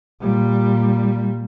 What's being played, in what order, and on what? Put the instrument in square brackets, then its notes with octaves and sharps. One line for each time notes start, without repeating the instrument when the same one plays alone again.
[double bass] A#2 G3